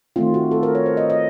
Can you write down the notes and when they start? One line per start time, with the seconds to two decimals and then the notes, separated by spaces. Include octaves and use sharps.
0.16 D#3 A3 C4 F4
0.34 F#4
0.51 A4
0.63 A#4
0.75 C#5
0.86 C5
0.97 D#5
1.10 D#5